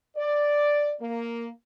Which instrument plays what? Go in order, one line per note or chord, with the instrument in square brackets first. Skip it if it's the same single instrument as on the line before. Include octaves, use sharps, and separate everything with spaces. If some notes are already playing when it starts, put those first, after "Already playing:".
[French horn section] D5
A#3